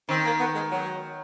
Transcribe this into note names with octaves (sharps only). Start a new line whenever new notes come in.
D#3 C4
A#3
B3
G#3
F#3